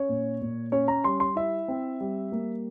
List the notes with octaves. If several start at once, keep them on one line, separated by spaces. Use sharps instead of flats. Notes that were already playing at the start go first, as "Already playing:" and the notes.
Already playing: C#4 C#5
A#2
A#2
C#4 C#5
A#5
G3 C6
C6
E4 E5
C4
G3
A#3